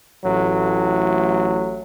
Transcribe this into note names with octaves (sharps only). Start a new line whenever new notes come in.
A1 A2 F#3